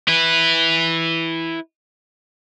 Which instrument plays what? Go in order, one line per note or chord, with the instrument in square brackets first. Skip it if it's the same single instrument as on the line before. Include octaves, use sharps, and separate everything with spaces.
[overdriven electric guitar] E4 B4